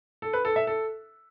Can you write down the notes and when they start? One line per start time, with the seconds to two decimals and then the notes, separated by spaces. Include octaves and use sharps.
0.22 A4
0.33 B4
0.45 A4
0.56 E5
0.67 A4